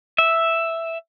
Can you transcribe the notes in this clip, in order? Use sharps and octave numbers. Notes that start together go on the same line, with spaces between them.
E5